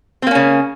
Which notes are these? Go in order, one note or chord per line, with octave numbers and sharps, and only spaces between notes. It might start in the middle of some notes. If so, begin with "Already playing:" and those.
C#3 A#3 C4 C#4